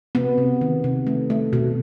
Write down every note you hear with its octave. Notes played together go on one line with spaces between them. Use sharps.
C3 B3
C3
D#3
C3
A3
A3
B2